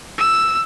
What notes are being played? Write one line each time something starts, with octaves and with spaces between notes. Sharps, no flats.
E6